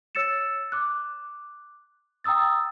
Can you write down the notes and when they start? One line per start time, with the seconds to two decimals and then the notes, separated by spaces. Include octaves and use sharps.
0.15 C#5 E6 A6 C#7 E7
0.72 D6 F#6
2.24 G5 A#5 D#6 E6 A6